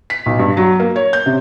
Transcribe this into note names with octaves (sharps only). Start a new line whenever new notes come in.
B6
B1
G2
F#3
A#3
C#5
G6
C3